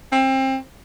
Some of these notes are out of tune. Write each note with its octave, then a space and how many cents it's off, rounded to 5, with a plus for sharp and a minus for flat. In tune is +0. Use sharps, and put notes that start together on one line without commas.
C4 +25